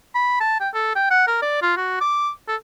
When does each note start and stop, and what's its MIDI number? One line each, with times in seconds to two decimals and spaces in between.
0.15 0.36 83
0.40 0.58 81
0.60 0.69 79
0.74 0.93 69
0.95 1.08 79
1.11 1.27 78
1.28 1.38 70
1.42 1.58 74
1.62 1.73 65
1.77 1.96 66
2.01 2.31 86
2.48 2.56 69